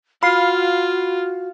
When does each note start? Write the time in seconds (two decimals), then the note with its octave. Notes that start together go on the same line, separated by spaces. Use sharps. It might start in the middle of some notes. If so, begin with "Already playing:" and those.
0.23 F4 F#4 F5 B5 C7